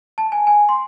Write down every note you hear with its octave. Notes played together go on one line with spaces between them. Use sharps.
A5
G#5
G#5
C6